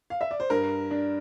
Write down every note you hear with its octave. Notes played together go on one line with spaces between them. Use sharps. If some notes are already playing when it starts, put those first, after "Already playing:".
F5
E5
D5
C5
G2 A#4
D4